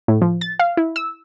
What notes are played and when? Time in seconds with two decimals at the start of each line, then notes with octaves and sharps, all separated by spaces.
0.08 A2
0.22 F3
0.41 A6
0.59 F5
0.77 E4
0.96 E6